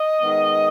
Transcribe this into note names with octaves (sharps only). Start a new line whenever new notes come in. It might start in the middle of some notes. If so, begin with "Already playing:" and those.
Already playing: D#5
D#3 G#3 B3